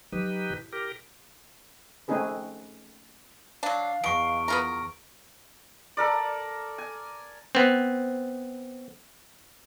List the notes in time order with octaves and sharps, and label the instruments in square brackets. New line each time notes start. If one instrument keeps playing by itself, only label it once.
[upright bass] F#3 [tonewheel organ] D#4 G4 B4
[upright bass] C3 E4
[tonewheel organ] G4 A#4
[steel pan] A3 C4 C#4 D#4 G#4 B4
[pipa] F#3 D4 [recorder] F5
[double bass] E2 [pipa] B2 [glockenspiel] C#6 D7
[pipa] B3 F4 A#4
[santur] A4 A#4 D5
G#5
[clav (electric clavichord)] B3 C4